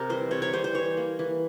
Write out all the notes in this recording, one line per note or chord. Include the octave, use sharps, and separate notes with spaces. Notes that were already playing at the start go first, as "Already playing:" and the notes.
Already playing: C3 A#4
E3 G3 C5
C3 C#5
C#5
E3 G3 C5
C5
E3 C#5
A#3
E3